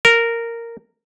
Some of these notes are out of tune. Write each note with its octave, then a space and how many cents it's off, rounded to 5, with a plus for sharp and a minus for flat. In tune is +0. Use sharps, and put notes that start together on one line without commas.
A#4 -10